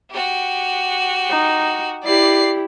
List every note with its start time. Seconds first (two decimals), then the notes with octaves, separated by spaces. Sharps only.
0.10 F#4 G4
1.30 D#4
2.04 E4 G4 D5 C7